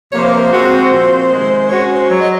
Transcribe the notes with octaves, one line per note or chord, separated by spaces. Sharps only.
C3 F3 A#3 C#5
C5
A#4
C5
G#3 C4 F#4
A#2 F3 C4
C3 D#3 G#3
G#3 C#4 F#4 C#5
C5
F#3 C#5
D#5